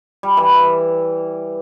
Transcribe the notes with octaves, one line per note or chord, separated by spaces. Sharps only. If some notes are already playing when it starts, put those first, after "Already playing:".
G3
E3